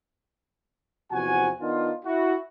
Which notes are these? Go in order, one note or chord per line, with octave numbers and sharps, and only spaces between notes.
E2 C3 F3 F#4 F#5 G#5
D#3 B3 D4 D#4 F4
E4 F#4